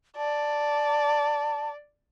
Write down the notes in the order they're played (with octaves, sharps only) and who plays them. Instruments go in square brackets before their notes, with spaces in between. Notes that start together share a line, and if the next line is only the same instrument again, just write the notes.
[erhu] D5 [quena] A5